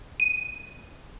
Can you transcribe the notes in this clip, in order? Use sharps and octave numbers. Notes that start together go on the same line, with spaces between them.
D#7